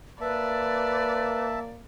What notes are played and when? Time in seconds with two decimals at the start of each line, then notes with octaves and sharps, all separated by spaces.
0.21 A#3 B4 D5 E5 A5